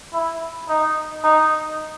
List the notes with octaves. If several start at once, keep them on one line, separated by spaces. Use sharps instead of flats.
E4
D#4
D#4